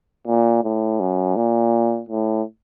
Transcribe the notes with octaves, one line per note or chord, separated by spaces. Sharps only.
A#2
A2
F#2
A#2
A2